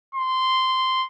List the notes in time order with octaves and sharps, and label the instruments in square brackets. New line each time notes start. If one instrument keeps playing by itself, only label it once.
[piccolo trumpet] C6